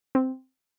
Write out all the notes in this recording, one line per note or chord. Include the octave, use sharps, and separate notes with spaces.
C4